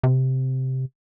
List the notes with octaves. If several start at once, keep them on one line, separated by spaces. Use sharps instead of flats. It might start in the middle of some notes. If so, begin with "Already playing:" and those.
C3